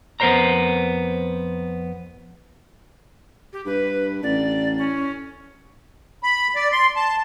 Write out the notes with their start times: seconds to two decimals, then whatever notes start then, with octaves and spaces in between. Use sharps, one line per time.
0.20 F2 B3 A#4 C5 C#5 A#5
3.53 G4
3.66 G2 B4
4.23 A1 D5
4.78 C#4
6.23 B5
6.55 D5
6.72 C6
6.96 A5